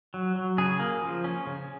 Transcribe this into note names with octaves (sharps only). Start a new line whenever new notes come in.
F#3
F#3
C#3 G#4
A#3
F3
C#4
C#3